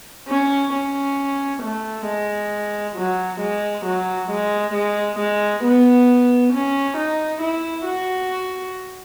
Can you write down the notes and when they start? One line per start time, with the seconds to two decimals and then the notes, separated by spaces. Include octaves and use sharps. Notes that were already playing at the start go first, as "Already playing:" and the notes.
0.28 C#4
0.73 C#4
1.63 A3
2.06 G#3
2.96 F#3
3.41 G#3
3.85 F#3
4.30 G#3
4.74 G#3
5.19 G#3
5.63 B3
6.53 C#4
6.97 D#4
7.41 E4
7.86 F#4